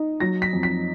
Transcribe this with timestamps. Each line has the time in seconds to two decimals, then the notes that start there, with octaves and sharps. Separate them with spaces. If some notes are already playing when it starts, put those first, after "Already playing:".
Already playing: D#4
0.20 F#3 A#6
0.42 B6
0.53 F2
0.63 B6